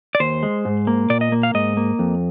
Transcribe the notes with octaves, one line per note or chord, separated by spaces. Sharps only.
D5
D#2 C5
G#3
G#2
A#3
A#2 D5
D#5
A#3
F5
G#2 D#5
A#3
F2